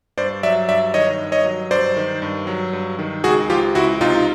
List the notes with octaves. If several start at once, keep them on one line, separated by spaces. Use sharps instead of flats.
G2 C5 D5
F#3 D5 E5
G2 D5 E5
D#3 C#5 D#5
G2
C#5 D#5
F#3
G2 C5 D5
D#3
G2
F#3
G2
D#3
C#2 F#4 G#4
F3 F4 G4
C#2 E4 F#4
C3 D#4 F4